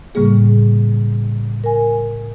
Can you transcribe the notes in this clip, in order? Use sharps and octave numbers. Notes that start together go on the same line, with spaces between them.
A2 C#3 G3 A#3 G#4
A#4 G#5